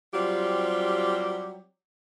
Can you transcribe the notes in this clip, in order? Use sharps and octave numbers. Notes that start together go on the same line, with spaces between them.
F#3 G3 C4 F4 G4